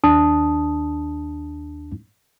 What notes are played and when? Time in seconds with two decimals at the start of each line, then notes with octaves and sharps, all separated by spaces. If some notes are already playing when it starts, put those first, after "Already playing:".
0.04 D#2 D4 A5 D#6